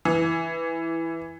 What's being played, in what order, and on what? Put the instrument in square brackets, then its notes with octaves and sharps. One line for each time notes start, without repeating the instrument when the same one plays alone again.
[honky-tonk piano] E3